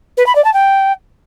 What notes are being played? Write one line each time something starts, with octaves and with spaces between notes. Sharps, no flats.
B4
B5
D5
A5
G5